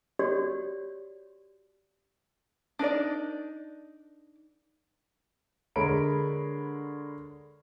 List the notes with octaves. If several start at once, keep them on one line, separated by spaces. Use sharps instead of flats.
F#4 G4 C#5 D5
D4 D#4 A#4 D5
D3 G#3 A#4 C#5 B5 D7